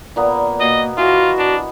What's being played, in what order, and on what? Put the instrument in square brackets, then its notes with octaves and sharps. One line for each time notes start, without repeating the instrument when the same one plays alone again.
[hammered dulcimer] A#2 A#3 B3
[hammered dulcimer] B2 [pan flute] A#3 [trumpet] D#5
[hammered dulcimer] E3 B3 [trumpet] F4 [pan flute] F#4
[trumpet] D4